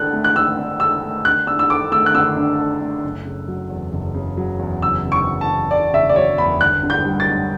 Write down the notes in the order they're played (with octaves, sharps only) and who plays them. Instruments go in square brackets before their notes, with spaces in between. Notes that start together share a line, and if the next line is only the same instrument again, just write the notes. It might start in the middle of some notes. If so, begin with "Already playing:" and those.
Already playing: [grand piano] D3 D4 A4 [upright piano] F#6
[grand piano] A3
[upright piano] F#6
[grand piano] D3 [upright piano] E6
[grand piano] D4
[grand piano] A4 [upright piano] E6
[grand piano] A3
[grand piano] D3 [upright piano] F#6
[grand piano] D4 [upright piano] E6
[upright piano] E6
[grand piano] A4 [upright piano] D6
[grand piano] A3 [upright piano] E6
[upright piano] F#6
[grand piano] D3 [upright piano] E6
[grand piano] D4
A4
A3
F#1
C#3
F#3
E2
F#1
C#3
F#3
E2
[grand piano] F#1 [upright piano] E6
[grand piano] C#3
[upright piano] C#6
[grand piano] F#3
[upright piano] A5
[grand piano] E2
[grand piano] F#1 [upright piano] D5
[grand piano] C#3 [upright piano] E5
[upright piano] D5
[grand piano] F#3 [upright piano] C#5
[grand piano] E2 [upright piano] B5
[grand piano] G1 [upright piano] F#6
[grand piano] D3
[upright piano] G6
[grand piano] G3
[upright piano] A6
[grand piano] F#2